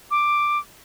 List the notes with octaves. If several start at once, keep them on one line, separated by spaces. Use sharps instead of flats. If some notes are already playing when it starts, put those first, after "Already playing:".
D6